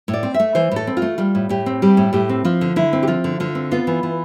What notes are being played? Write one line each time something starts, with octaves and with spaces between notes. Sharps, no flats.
A2
D5
C4
E5
A3
E3 C5
A2 A4
C4
F4
A3
G3 F4
A2
A2 G4
C4
G3 G4
A2
A2 G4
C4
F3 F4
D3
D3 E4
C4
G4
F3 F4
D3
D3 F4
C4
B3 F4
E3
E3